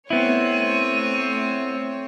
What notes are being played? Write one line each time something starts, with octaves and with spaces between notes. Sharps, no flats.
A3 B3 C4 E4 C#5 D#7